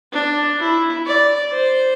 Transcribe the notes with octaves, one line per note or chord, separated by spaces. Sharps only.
D4
E4
D5
C5